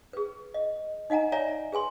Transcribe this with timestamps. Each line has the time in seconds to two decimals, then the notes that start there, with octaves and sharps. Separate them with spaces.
0.13 G#4 B4
0.54 D#5
1.10 D#4 D#5 F#5 G#5 A#5
1.32 C#5 D5 E5 G#5 A#5
1.72 G#4 B4 G#5 C6